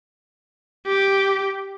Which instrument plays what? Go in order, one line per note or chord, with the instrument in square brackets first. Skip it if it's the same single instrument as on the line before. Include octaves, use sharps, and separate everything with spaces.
[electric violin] G4